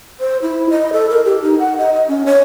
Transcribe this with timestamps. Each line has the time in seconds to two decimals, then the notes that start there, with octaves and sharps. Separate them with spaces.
0.20 C5
0.42 E4
0.70 D#5
0.93 A4
1.10 A#4
1.25 G4
1.42 D#4
1.59 F#5
1.78 D#5
1.94 D#5
2.08 C#4
2.26 C#5